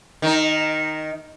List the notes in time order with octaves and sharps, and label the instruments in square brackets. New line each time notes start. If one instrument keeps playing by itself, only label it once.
[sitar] D#3 D#4